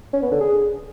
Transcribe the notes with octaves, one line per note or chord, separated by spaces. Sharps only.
C#4
B3
D3
G#4